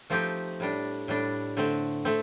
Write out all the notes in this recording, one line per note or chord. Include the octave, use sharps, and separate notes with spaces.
F3 A3 C4 D#4 G4
A2 G3 D4
A2 G3 D4
D3 A3 C4
A3 C4